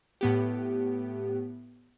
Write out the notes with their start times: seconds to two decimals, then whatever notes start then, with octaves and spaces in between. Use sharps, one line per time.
0.21 A2 B3 G4